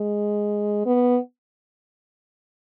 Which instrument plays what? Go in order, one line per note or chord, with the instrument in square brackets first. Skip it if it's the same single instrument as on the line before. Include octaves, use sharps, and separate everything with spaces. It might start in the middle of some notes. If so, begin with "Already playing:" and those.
Already playing: [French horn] G#3
B3